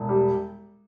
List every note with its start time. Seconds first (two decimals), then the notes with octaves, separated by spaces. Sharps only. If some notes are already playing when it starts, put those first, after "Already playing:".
Already playing: E1
0.09 G3